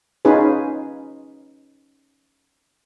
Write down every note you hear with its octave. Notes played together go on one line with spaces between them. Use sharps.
C#4 D#4 F4 G#4 B4